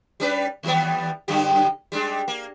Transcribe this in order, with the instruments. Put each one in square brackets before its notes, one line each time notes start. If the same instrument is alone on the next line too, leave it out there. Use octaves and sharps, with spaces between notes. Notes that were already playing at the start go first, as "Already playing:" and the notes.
[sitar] G3 C#4 B4
D#2 G3 B3
F#2 D3 G4
G3 G#3 D4
A#3